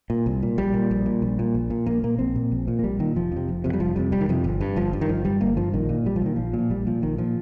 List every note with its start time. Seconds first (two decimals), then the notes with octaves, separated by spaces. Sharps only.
0.10 A#2
0.26 C2
0.43 A#2
0.58 A#1 G3
0.74 A#2
0.91 A#1
1.06 A#2
1.22 A#1
1.39 A#2
1.54 A#1
1.70 A#2
1.86 A#1 A#3
2.03 A#2 A#3
2.19 A#1 C4
2.36 A#2
2.52 A#1
2.68 A#2
2.79 A#3
2.83 A#1 G3
2.99 A#2 D#3
3.15 F1 F3
3.32 F2 C3
3.49 F1
3.64 F2 C3
3.73 G3
3.80 F1 F3
3.96 F2 C3 G3
4.12 F1 G3
4.21 D#3
4.29 F2 C3 F3
4.44 G1
4.61 G2
4.76 G1 F3
4.93 G2
5.01 D#3
5.09 G1 F3
5.25 G2 G3
5.41 G1 A#3
5.57 G2 F3
5.73 A#1 D#3
5.89 A#2
6.05 A#1 G3
6.16 F3
6.22 A#2 D#3
6.36 A#1 F3
6.53 A#2 F3
6.70 A#1 G3
6.87 A#2 F3
7.02 A#1 D#3
7.18 A#2 F3